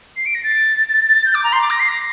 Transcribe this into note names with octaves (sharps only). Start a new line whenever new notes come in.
C7
D7
A#6
A6
G6
D6
A#5
C6
D6
A#6
C7
A#6